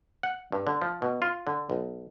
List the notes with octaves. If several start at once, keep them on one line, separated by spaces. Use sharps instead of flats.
F#5
G2
D3
F3
B2
F4
D3
B1